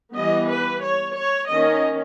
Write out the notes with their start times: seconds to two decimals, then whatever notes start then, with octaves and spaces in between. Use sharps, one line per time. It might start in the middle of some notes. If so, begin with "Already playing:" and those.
0.15 E3 G3 B3 D#5
0.49 B4
0.82 C#5
1.17 C#5
1.50 D#3 A#3 C#4 D#5